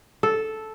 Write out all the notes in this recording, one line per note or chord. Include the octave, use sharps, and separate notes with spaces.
A4